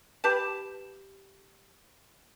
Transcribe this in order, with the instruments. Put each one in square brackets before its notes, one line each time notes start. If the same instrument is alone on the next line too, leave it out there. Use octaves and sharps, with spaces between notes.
[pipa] G4 B4 A5